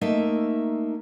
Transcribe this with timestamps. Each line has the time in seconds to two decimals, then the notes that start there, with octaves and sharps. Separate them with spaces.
0.01 A3 A#3 D#4 E5